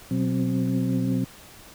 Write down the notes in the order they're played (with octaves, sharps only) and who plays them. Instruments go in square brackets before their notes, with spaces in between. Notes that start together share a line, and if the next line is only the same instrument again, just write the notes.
[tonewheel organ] B2 F#3 C4